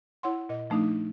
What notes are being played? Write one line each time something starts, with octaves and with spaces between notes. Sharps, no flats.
E4 C#5 F#5 C6
A#2 D#5
F3 A3 D4 D#4